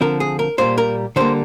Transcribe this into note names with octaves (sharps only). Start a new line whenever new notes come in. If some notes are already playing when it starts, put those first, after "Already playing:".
D3 F3 C4 A#4
G#4
A#4
A#2 G3 A#3 C5
A#4
D3 G3 A#3 C5